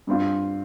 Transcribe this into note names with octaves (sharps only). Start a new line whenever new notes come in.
G2 G3 C4 F4